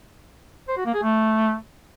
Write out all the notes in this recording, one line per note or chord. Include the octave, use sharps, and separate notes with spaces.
C5
F#4
A#3
G#4
A3